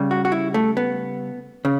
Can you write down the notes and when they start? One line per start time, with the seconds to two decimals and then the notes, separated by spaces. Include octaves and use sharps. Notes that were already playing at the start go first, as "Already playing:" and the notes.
Already playing: C#3 G3
0.11 F#4
0.25 F#4
0.32 E4
0.54 A3
0.77 B3
1.65 C#3